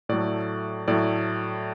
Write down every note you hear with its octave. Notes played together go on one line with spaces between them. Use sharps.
A2 F#3 A3 D5
A2 F#3 A3 D5